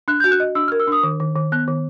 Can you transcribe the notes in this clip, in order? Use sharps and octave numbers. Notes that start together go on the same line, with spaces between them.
D4 F#6
G6
F#4
F#6
D#5
D4 E6
F6
A#4
E6
D4 D#6
D#3
D#3
D#3
B3 F#6
D#3